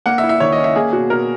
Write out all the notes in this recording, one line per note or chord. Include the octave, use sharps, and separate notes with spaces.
A#3 F#5
E5
E4
E5
D#3 C#5
D#5
C#4
E5
A#3 G#4
B2 F#4
B2 A#4